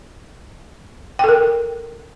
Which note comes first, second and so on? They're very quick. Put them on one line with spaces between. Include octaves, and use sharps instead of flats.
G5 A4 A#4